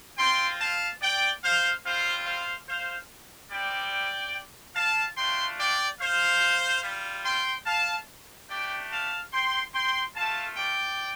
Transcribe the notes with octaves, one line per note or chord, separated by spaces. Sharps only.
C4 F4 G5 C6
F5 A5
D5 G5
C5 F5
G3 C4 F4 C5 F5
C5 F5
C5 F5
G3 C4 G4 D5 G5
F5 A5
A3 D4 F4 G5 C6
D5 G5
C5 F5
G3 F4
G5 C6
F5 A5
A3 D4 G4 D5 G5
F5 A5
G5 C6
G5 C6
A3 F4 F5 A5
D5 G5